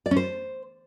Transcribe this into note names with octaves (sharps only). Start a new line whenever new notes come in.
D5
C#4
C5